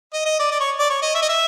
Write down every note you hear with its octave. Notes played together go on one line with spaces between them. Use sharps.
D#5
D#5
D5
D5
C#5
D5
C#5
D#5
E5
D#5
E5